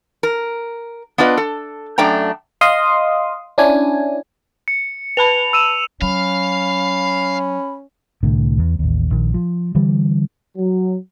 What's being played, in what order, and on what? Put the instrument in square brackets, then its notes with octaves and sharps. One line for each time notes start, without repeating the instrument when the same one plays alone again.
[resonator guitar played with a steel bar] A#4
B3 D4 F4 B4 D#5
A4
F#2 A3 D4 G5 A#5
[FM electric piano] D#5 F5 C6 D#6
C#4 D4 E4 G#5
[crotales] C#7
[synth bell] B4 A5 B5 [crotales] F7
[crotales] E6 D#7 E7
[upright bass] F#3 [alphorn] C#4 [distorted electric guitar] F5 [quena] B5
[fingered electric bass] C2 A2 D3
E2
A1 D#2
A#1 D#3
F3
D3 E3 G3
[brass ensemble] F#3